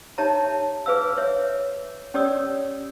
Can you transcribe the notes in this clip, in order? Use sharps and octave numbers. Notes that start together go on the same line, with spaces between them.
D#4 G4 C#5 E5 A5 A#5
G#4 B4 F5 E6
C#5 E5
C#4 G4 C#5 D5 D#6 E6